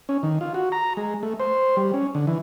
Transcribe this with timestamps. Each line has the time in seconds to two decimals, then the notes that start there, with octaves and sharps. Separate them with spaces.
0.09 C#4
0.23 D#3
0.41 F4
0.54 F#4
0.72 A#5
0.97 G#3
1.23 A3
1.40 C5
1.77 G3
1.94 C#4
2.15 D3
2.27 E3